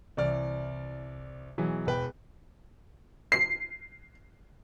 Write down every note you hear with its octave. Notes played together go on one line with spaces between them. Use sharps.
C2 E3 D5 F6
B2 E3 F#3 G#4
E1 B4 G5
C7